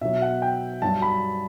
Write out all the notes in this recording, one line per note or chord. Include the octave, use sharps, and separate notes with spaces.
B2 F#3 E5
F#5
G5
G2 F#3 A5
B5